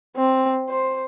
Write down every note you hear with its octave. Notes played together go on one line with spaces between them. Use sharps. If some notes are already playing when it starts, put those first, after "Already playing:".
C4
C5